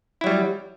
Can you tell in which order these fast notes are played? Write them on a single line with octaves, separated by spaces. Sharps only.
E4 F#3 G3